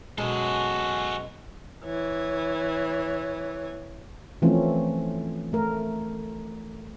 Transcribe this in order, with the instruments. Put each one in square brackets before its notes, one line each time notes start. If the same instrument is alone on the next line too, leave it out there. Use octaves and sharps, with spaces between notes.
[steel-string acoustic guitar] F#2 B2 G#3 [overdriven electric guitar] C#4 A4 [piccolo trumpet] F#4
[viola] E3 C#5
[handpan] E3 F3 A3 C4 C#4
A3 A#4